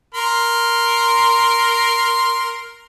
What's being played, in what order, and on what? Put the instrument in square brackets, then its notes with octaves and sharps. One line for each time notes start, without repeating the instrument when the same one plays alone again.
[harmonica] A#4 C6